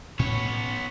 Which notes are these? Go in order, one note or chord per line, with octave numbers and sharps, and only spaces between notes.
A2 B3 C#4 C#5